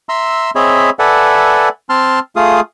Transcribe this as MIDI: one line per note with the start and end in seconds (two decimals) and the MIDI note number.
0.09 0.50 76
0.09 0.50 82
0.09 0.50 84
0.09 0.50 88
0.55 0.90 60
0.55 0.90 68
0.55 0.90 73
0.55 0.90 75
0.55 0.90 76
0.55 0.90 83
0.99 1.69 69
0.99 1.69 71
0.99 1.69 74
0.99 1.69 76
0.99 1.69 78
0.99 1.69 80
1.89 2.19 60
1.89 2.19 81
1.89 2.19 84
1.89 2.19 89
2.36 2.61 57
2.36 2.61 65
2.36 2.61 68
2.36 2.61 77
2.36 2.61 87